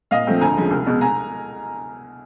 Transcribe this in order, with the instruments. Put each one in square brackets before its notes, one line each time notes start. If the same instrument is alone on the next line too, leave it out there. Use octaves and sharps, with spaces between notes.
[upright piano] A#2 D#5 F5
F3 A3 C4
D2 G#5 A#5
C#3 F3 G#3
C2
B2 G#3
G#5 A#5